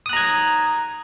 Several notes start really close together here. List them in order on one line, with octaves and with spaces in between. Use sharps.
D#6 F#6 A#5 G#6